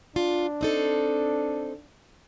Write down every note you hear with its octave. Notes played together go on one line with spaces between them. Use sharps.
D4 F4
C4 D#4 A4